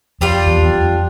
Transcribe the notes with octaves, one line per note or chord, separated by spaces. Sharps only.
F2 G3 D4 F4
E2
E2
F2